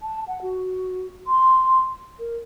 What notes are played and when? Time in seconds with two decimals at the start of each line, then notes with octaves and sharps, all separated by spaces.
0.03 A5
0.28 F#5
0.42 F#4
1.27 C6
2.19 A#4